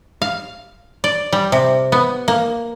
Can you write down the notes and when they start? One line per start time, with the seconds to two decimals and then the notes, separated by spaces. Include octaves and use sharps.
0.22 F5
1.04 D5
1.33 G3
1.52 C3
1.92 B3
2.28 A#3